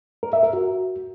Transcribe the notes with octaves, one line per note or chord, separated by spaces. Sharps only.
A#4
E5
A#4
F#4